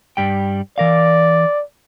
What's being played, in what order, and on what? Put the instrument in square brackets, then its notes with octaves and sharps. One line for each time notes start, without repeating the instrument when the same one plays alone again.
[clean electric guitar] G2 G3 G5
[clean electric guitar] E3 A#4 F5 [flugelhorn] D5